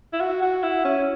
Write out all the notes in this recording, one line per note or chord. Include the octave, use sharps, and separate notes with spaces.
E4
F#4
F#4
E4
C#4